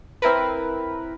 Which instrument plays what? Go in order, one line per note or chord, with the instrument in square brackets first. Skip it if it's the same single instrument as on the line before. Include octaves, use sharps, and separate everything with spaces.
[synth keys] C4 E4 A#4 B4